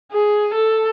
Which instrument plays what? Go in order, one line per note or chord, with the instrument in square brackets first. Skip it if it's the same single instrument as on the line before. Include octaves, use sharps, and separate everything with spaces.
[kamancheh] G#4
A4